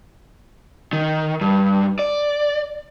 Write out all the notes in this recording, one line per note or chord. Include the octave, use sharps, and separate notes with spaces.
D#3
G2
D5